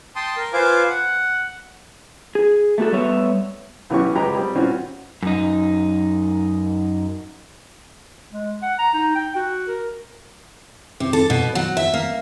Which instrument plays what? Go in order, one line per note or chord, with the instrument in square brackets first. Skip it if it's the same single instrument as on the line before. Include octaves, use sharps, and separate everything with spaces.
[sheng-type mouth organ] G5 A5 C6 D#6
A#4
F4 B4 C5 F5 G#5 D6
F#5
[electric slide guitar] G#4
A3 A#3 F#4 A4
G3 A3 B3 C#5 E5
[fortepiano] B1 E3 F#3 C#4 G4 C#6
C#2 G#3 G4 B4 A#5 B5
G3 C4
A#2 E3 C4 C#4 F4 F#4
[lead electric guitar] F#2 D#4
[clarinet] G#3
F#5
A#5
D#4
G5
F#4
A#4
[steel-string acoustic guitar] C3
A4
B2
F#3
E5
A#3